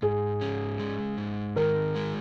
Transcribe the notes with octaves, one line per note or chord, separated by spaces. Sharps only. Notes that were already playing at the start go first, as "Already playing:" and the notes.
G#2 G#4
C#4
G#3
G#2
D#3 A#4
G#3